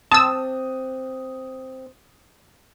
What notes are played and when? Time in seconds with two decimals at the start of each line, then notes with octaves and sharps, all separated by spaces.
0.11 C4 A5 D#6 E6